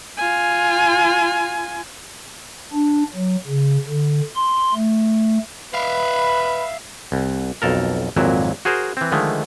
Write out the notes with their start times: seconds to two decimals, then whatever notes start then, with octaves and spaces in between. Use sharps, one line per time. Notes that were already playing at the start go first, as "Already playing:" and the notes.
0.17 F4 G#5
2.73 D4
3.15 F#3
3.47 C#3
3.87 D3
4.36 C6
4.74 A3
5.74 B4 E5 F5 B5
7.12 C2
7.62 B1 F2 A4 A#4
8.16 G#1 F2 A#2 F#3 E4
8.65 F#4 G#4 A#4 C5
8.97 E3 C4
9.12 D3 D#3 F3 G#3 A3